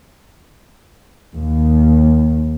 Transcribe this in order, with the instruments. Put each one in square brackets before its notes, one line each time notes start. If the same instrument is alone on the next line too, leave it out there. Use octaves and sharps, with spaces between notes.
[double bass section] D#2